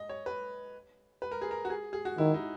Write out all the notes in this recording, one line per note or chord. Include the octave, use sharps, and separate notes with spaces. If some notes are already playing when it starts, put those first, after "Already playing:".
Already playing: D#5
C#5
B4
B4
A#4
G#4
A#4
F#4
G#4
G#4
F#4
D#3 E4
D#4